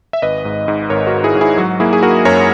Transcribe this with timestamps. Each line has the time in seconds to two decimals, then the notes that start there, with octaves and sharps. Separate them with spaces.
0.13 E5
0.22 G#1 B4 D#5
0.45 G#2
0.68 G#2
0.90 G#1 A#4 C#5
1.07 F#4 A#4
1.13 G#1
1.24 E4 G#4
1.35 G#2
1.41 E4 G#4
1.58 F#3 F#4
1.80 A#3 E4 G#4
1.93 G#4
2.03 A#3 F#4 A#4
2.25 F#2 A#4 C#5